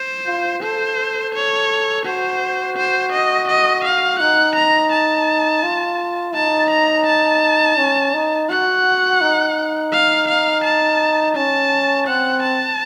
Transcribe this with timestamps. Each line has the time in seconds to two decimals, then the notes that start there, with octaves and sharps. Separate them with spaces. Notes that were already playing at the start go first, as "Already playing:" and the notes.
Already playing: C5
0.26 F4
0.62 A4 C5
1.34 C#5
2.05 F#4 C5
2.77 C5
3.12 D#5
3.48 D#5
3.84 F5
4.20 D#4 F#5
4.56 A#5
4.92 A5
5.63 F4
6.35 D#4 A5
6.71 A#5
7.07 A5
7.78 C#4
8.14 D#4
8.50 F#4 F#5
9.21 D#4
9.92 F5
10.28 F5
10.64 A5
11.35 C#4 A5
12.07 C4 F#5
12.43 A5